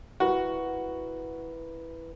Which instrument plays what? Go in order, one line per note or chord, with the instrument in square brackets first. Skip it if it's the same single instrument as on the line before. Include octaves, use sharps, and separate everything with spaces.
[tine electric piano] E4 A#4 B4 [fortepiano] F#4